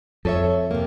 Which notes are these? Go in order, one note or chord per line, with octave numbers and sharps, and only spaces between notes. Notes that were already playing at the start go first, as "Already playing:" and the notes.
F2 A4 C#5 E5
C3 A#3